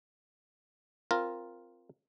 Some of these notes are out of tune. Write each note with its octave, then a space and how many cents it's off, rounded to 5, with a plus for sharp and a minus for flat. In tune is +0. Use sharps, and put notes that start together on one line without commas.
C4 +0 F4 +0 A#4 +0